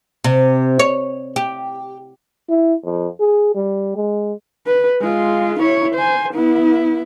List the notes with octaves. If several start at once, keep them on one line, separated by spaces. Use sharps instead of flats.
C3
C#5
G4
E4
F2
G#4
G3
G#3
B4
G#3 F4
E4 C#5
C5 G#5
B3 E4